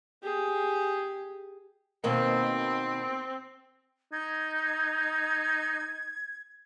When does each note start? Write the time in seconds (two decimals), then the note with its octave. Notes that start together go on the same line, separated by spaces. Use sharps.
0.23 G4 G#4
2.04 B2 D#3 A#3 C4
4.12 D#4 G#6